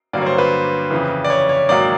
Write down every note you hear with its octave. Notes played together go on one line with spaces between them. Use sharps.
G2 D3 F#3 A#3 D5
C#5
C5
B4
F2 C#3 E3
D5
C#5
C#5
G#2 D#3 F#3 A#3 D5